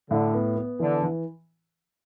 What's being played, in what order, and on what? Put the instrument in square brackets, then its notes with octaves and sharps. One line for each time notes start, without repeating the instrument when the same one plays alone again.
[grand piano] A2 [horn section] D3
[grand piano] B3
B3
[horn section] D3 [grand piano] E3
[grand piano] E3